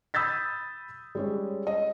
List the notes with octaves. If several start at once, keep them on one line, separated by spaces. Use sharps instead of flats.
B5 D#6 E6 G6 A6 B6
G3 G#3 C#4
D#5